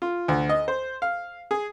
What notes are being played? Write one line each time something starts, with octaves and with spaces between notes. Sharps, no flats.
F4
D2
D#5
C5
F5
G#4